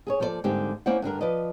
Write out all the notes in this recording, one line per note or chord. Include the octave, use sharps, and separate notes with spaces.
G#4 A4 C#5
F3 A#3 A4 A#4 D5
G#2 D3 G3 A#3 C4 G4
A#3 C#4 E4 C5 D5 F#5
G2 D3 D4 A#4
F3 B4 D5 D#5